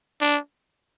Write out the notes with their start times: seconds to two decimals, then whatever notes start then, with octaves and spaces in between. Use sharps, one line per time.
0.21 D4